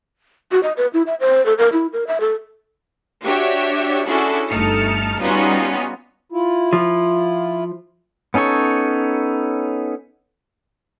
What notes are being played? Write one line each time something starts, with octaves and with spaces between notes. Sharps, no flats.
F#4
D#5
B4
E4
E5
C5
A4
A#4
E4
A#4
E5
A4
D4 F#4 G4 C#5 E5
C#4 D4 E4 F#4 G#4 A4
G1 A3 D#4 A5 F6 C#7
G3 B3 C#4 D#4 F4 F#4
E4 F4
F3
B3 C#4 D#4 A4 C#5